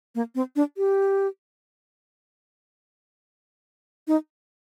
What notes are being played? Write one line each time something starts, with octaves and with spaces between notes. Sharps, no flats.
A#3
C4
D4
G4
D#4